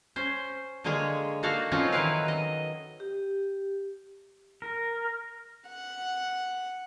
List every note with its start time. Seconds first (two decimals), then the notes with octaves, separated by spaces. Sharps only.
0.16 C#4 C5
0.84 D3 G#3 A#3 G#4 C#5
1.43 A#3 D#4 F#4 A4 F5
1.72 F3 C4 C#4 D#4 F4
1.92 D#3 E3 F#3 E4 B4 F5
2.28 D#5
3.00 G4
4.62 A#4
5.69 F#5